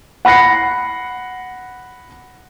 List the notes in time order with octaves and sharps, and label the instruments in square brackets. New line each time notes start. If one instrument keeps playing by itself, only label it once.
[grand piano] F#5 B5 F#6 A#6 C7 C#7